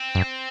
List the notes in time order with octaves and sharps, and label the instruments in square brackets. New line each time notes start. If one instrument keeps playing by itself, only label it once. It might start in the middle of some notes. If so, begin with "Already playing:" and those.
Already playing: [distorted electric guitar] C4
[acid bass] F#2